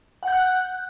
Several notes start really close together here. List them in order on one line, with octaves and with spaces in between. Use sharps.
F#5 G6 F#6